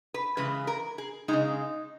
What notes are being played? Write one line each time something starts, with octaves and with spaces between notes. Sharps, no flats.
B4
C#3 E3 G#3 B4
A#4
G#4
C#3 F3 G#3 D#4